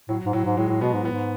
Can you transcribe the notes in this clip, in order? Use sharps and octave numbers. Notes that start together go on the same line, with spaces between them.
A2 F#3
G#2
A2 F#3
G#2
A2 G#3
A2
B2 B3
G#2
A2 B3
G#2